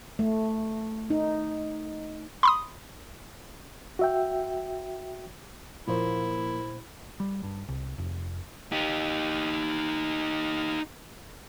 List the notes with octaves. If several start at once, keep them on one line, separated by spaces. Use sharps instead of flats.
A3
D#4
B5 C6 D#6
F#4 E5 G5
A#2 F3 A#3 E4 C5 C#5
G3
G2
C2
F1
D#4 G4